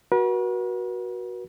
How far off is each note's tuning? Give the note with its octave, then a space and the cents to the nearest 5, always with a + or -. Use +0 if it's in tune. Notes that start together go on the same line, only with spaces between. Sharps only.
F#4 +0 B4 -45